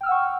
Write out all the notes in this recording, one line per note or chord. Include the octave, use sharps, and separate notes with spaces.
F#5 G5 C#6 E6 F6